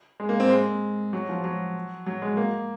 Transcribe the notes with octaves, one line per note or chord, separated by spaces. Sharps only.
G#3
A#3
C4
G#3
F#3
F3
F#3
F#3
G#3
A#3